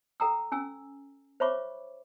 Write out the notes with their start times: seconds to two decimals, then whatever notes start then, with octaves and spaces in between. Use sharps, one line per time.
0.20 A4 G5 A#5 D#6 E6
0.52 C#4 G#5 E6
1.40 C5 C#5 E5 B5 C#6 D6